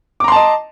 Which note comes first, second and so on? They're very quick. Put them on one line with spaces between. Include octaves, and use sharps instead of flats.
D6 A#5 C6 A5 D#5